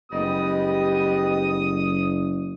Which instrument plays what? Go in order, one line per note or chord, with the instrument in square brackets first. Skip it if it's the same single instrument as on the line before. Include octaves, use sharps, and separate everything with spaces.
[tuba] F#1 [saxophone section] G3 G#3 D#5 [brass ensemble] B3 G4 [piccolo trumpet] D#6